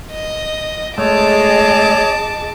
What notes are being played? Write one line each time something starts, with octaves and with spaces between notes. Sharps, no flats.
D#5
G#3 A3 G#4 C#5 D#5 A5 D6